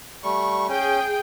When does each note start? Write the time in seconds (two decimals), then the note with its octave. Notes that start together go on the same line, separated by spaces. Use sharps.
0.23 G3 A3 C#6
0.69 C#4 G#4 G5